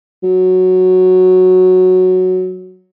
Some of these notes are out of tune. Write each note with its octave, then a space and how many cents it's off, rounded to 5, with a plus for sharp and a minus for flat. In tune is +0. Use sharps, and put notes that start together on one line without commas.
F#3 -5